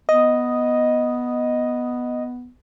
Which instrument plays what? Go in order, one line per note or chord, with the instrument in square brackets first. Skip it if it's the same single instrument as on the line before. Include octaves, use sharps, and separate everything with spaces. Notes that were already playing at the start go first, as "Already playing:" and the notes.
[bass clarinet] B3 [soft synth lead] D#5